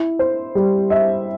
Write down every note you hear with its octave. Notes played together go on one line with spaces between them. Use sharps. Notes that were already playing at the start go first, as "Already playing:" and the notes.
Already playing: E4
C5
G3
E5